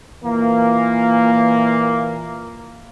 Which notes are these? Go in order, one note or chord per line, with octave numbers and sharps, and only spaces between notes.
A#2 E3 A#3